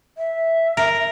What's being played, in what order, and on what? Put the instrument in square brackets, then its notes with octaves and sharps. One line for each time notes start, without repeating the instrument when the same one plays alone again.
[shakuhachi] E5
[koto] A#4